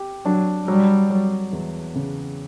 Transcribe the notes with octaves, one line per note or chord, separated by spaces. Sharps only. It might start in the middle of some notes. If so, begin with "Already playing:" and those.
Already playing: G4
F#3 D4
F#3 G3
F#3
E2
C#3